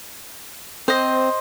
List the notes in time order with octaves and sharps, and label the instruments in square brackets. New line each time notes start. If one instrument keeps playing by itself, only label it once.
[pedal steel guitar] C4 [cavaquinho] C5 D#5